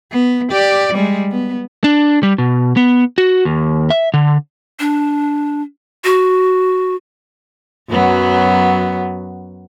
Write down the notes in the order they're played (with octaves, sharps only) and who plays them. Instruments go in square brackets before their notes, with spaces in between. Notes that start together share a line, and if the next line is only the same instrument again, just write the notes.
[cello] B3
G4 D5
G3 G#3
B3
[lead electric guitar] D4
G3
B2
B3
F#4
D#2
E5
D3
[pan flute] D4
F#4
[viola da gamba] F#2 F#3 B3